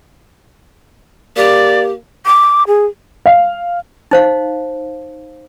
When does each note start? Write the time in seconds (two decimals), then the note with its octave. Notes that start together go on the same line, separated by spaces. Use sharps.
1.37 A#3 G4 D5
2.26 D6
2.68 G#4
3.26 F5
4.11 D#4 C5 F5